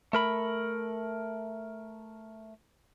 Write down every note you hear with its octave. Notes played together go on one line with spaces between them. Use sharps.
A3 A#4 B5